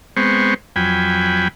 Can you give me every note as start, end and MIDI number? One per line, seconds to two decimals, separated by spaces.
0.16 0.54 56
0.16 0.54 59
0.16 0.54 60
0.16 0.54 72
0.16 0.54 85
0.76 1.48 41
0.76 1.48 54
0.76 1.48 79
0.76 1.48 80
0.76 1.48 83